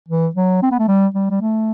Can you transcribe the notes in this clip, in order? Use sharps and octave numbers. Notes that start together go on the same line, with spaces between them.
E3
F#3
C4
B3
A3
G3
G3
G3
A3